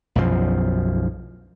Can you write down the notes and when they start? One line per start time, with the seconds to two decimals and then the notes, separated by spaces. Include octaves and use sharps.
0.15 B1 F#2 F3